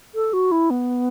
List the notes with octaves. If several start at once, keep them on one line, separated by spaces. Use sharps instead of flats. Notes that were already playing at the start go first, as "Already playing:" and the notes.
A4
F#4
E4
B3